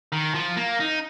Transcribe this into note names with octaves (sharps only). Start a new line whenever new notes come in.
D#3
F3
A#3
D#4